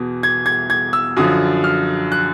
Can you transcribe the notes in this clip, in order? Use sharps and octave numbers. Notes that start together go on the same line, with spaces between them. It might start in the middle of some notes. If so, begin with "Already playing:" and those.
Already playing: E2 B2
G#6
G#6
G#6
E6
F#2 D3 F3 D#6
F6
F#6